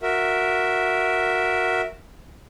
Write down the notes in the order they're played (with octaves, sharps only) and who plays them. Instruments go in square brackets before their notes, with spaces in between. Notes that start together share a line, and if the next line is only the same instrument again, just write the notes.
[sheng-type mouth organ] F#4 A#4 E5